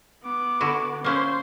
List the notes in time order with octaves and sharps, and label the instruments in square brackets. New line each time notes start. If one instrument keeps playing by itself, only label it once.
[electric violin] B3 D6
[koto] D3 E4 F#4
[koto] A#3 C#4 E4 [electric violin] C5